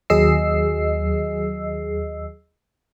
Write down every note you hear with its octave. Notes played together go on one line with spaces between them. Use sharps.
D#2 F#3 G#4 D#5 E6 C7